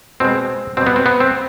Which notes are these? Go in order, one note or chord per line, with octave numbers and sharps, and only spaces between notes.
B2 G#3 C4
B2 G3 C4
B3
C4
B3
C4